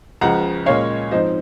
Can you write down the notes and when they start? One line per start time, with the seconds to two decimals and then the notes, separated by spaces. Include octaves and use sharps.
0.21 C#2 C#3 F3 F#5 A#5
0.66 A#2 G#3 C#4 C#5 F5
1.11 G#2 F3 C4 D#4 C5 D#5